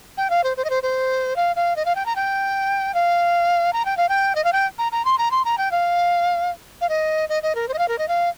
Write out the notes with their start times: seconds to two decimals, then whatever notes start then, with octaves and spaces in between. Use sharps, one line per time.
0.18 G5
0.30 F5
0.44 C5
0.57 C5
0.65 D#5
0.70 C5
0.83 C5
1.36 F5
1.56 F5
1.76 D#5
1.85 F5
1.95 G5
2.06 A#5
2.16 G5
2.94 F5
3.73 A#5
3.85 G5
3.97 F5
4.09 G5
4.35 D#5
4.44 F5
4.53 G5
4.78 A#5
4.92 A#5
5.05 C6
5.18 A#5
5.31 C6
5.45 A#5
5.58 G5
5.72 F5
6.81 F5
6.89 D#5
7.29 D#5
7.43 D#5
7.55 A#4
7.68 C5
7.74 D#5
7.78 F5
7.88 A#4
7.98 D#5
8.08 F5